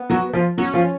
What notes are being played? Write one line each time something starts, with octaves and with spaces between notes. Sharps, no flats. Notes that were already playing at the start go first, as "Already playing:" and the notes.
Already playing: B3
F#3 F#4
F3 F4
F#3 C#4 F#4
F3 F4